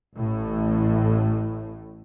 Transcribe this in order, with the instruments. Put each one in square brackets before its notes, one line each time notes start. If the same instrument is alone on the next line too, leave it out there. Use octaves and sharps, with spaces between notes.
[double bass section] A1 A2